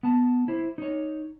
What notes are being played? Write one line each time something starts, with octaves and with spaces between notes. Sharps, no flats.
B3 A5
E4 C5
D#4 C#5